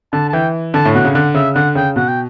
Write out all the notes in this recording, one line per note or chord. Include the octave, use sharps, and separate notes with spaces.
D3 A5
A5
E3 G5
D3 A5
A2
B2 F#5
C#3
D3 F#5
C#3 E5
D3 F#5
C#3 G5
B2 F#5
G5